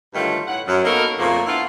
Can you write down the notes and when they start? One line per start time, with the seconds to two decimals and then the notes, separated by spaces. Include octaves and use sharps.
0.14 G2 D3 D#3 F#3 A3 F4
0.47 A2 F#5
0.67 F#2
0.84 A#3 B3 D#4 F#4 A4 A#4
1.18 F2 A#2 C#3 A3 A#3 C4
1.46 B3 D4 E4 F4